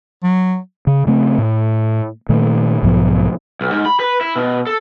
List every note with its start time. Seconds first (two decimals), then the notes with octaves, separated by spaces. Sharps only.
0.23 F#3
0.87 C#3
1.07 C#3 A3 C4
1.38 A2
2.29 A#2 D#3 A3
2.83 B1 G#2 F3 B3
3.61 B1
3.72 G#2
3.86 B5
4.00 B4
4.21 E4
4.36 B2
4.67 A4